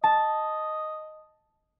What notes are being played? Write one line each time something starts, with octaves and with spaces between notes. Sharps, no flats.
D#5 A5